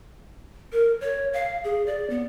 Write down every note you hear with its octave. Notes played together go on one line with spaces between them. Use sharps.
A#4
C#5
F5
G#4
D5
B3